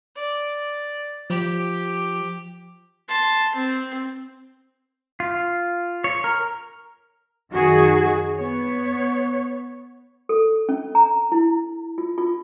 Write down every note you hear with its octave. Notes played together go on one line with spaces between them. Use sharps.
D5
F3 G4
A5 C6
C4
F4
C#5
A#4
F#2 D#3 F#4 G#4
B3 C#5
A4
C#4
A#5
E4
F4
F4